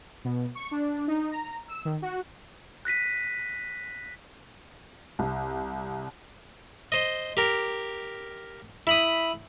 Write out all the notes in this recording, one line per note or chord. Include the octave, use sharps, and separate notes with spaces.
B2
C#6
D4
D#4
A#5
E6
D#3
F#4
F#6 A#6 B6 D#7
C2
C5 D#5
G4 A#4
E4 B5 D#6